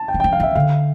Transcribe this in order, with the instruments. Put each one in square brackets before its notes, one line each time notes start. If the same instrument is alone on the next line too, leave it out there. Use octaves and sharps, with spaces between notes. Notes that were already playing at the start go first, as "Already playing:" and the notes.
Already playing: [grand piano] A5
G5
[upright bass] E3
[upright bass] F3 [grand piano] G5
[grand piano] F5
[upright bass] E3 [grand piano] E5
[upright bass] D3 [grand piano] F5